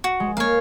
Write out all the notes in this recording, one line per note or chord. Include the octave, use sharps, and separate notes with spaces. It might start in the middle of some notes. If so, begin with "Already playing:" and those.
F#4
G#3
A#3 C#5 F5